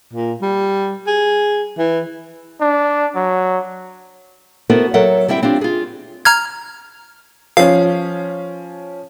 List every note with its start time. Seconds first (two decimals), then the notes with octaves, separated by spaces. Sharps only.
0.13 A#2
0.42 G3
1.07 G#4
1.78 E3
2.61 D4
3.16 F#3
4.70 B3 E4 F#4 A4 A#4 C5
4.94 F#3 A4 A#4 E5 F#5
5.28 G3 C4 E4 E5 G5
5.43 C4 D4 F4 G4
5.61 F4 G#4
6.25 A#5 F6 G#6
7.57 F3 C#4 F5